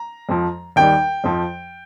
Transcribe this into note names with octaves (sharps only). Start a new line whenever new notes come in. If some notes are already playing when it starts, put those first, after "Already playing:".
Already playing: A#5
F2 F3
D#2 D#3 G3 G5
F2 F3